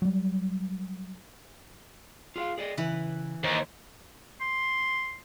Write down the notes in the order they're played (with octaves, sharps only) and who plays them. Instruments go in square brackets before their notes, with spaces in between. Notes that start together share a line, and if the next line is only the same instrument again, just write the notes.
[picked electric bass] F#3 G3
[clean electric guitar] F4 G#4 F5
G#4 D5 D#5
[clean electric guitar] C#3 [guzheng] E3 B4
[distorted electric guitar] D#2 [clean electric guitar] C5 D#5
[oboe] C6